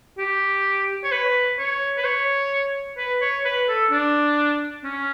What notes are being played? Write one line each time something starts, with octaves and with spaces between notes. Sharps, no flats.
G4
C#5
B4
C#5
B4
C#5
B4
C#5
B4
A4
D4
C#4